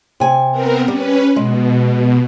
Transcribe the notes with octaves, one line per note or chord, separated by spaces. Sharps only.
C3 G#5
B3 C4 A#4
G3 C#4 B4
B2 G#3